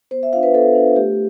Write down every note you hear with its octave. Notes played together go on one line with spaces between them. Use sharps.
B3 C5
E5
D4 F4 F5
B4
B3 A4
D4 F4
A3 G4